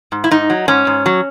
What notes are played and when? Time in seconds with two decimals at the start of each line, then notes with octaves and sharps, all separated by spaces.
0.12 G#2
0.24 E4
0.31 G#2 D#4
0.50 F#3
0.68 G#2 C#4
0.87 G#2
1.06 F#3